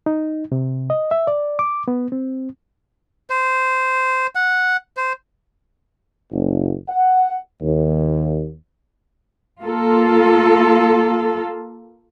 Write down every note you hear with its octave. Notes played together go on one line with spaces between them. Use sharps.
D#4
C3
D#5
E5
D5
D6
B3
C4
C5
F#5
C5
F#1
F#5
D#2
A#3 F4 A4